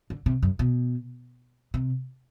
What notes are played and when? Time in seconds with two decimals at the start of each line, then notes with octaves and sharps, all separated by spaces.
0.10 D3
0.26 C3
0.43 F#2
0.59 B2
1.74 C3